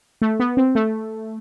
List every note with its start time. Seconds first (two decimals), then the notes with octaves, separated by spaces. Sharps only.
0.21 A3
0.40 B3
0.57 C4
0.75 A3